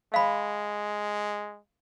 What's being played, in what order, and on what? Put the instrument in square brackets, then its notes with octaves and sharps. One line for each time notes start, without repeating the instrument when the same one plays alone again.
[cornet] G#3 [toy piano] F5 B5